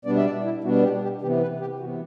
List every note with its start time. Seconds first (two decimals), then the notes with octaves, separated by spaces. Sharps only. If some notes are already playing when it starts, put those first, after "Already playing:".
0.05 B2 G3 B3 D4 D5
0.17 E5
0.25 D5
0.44 E4
0.64 B2 G3 B3 D4 F#4
0.83 G4
1.02 G4
1.21 C3 E3 B3 G4
1.41 B4
1.60 G4
1.79 C3 E3 B3 F#4